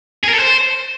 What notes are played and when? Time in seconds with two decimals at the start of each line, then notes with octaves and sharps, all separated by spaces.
0.23 G#4
0.29 A#4
0.34 A4
0.39 C5